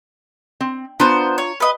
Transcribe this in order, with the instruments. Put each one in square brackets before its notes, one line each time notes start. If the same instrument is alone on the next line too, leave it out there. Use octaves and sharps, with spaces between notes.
[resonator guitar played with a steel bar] C4
[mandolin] B3 C5 [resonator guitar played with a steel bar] D4 F4 A#5
[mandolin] C#5
B4 D#5